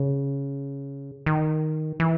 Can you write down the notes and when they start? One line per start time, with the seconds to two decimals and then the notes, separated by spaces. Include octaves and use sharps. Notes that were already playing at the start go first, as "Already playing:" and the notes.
Already playing: C#3
1.26 D#3
2.00 E3